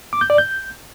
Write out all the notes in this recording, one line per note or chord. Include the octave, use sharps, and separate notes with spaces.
D6
G6
D5
G6